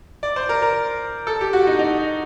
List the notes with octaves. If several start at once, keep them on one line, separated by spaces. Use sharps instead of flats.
D5
C5
A#4
A#4
A4
G4
F#4
D#4
D#4